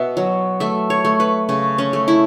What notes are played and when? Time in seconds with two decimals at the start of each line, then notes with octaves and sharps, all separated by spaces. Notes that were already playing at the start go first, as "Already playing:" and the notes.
Already playing: B2 F#4 E5
0.17 F#3
0.60 A3 E5
0.90 C#5
1.05 A3
1.20 B4
1.49 C#3 C#4
1.78 C#4
1.93 A3
2.08 E4